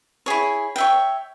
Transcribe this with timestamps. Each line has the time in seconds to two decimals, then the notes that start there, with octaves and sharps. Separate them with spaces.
0.26 E4 G#4 C#5
0.76 C#5 E5 G5